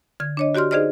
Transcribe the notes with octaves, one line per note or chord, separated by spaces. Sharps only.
D3 G#6
D4 C#5 D#5
F#4 G4 D5 C6 F6
D#4 G#4 C5 D5 D#5 F6